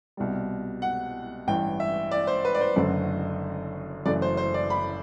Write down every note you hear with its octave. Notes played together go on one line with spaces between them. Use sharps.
C2 B2 G3
F#5
A1 G2 E3 G5
E5
D5
C5
B4
D5
C5
F#1 F#2 D3 F#3 A3
F#1 F#2 E3 A3 D5
C5
C5
D5
B5